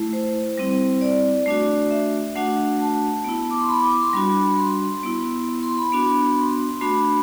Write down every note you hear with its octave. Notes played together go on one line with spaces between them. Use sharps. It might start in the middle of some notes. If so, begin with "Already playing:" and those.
Already playing: A3 E4
C5
G3 C4 E4
D5
A3 D4 F#4
E5
A3 D4 F#4 F#5
A5
B3 E4
D6
C6
B5
D6
D6
C6
G3 D4 F#4 B5
C6
B3 E4
C6
B5
B3 D4 F#4
C6
A3 D4 F#4 B5